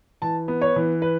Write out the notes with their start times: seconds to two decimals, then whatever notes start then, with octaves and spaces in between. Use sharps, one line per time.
0.22 E3 A5
0.48 B3
0.61 C#5
0.76 E3
1.02 B4